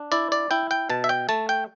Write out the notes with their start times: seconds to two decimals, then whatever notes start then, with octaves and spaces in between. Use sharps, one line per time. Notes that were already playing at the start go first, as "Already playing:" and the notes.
Already playing: D4
0.12 E4 D5
0.32 D5
0.51 E4 G5
0.71 G5
0.90 B2 A5
1.04 E5
1.09 G5
1.29 A3 A5
1.49 G5